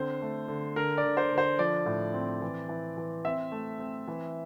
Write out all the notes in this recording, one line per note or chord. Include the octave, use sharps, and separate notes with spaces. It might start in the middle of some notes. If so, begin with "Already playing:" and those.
Already playing: D3 C4 C5
A3
D3
D3 A#4
D5
D3
C5
D3
C5
F3 D5
A2
C4
E3
E3
E3
C4 E5
A3
C4
E3